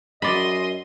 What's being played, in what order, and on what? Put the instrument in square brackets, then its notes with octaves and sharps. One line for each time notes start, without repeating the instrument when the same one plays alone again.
[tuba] F#2 [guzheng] D5 B5 [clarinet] D#5 [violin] C6 D#7